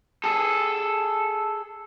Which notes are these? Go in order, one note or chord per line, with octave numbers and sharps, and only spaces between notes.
G#4 A4